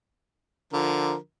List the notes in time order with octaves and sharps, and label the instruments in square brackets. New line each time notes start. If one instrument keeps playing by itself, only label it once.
[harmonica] D3 F3 A#4